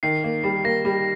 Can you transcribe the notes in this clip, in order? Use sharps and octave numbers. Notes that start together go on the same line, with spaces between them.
D#3 C7
A#3
G3
A#3 A#6
G3